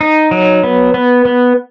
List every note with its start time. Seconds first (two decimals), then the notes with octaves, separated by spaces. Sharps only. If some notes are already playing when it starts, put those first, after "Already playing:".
0.01 D#4
0.31 F#3
0.64 B3
0.94 B3
1.25 B3